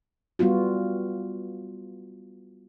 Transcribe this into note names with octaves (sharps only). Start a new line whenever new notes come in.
G3 B3 F4 F#4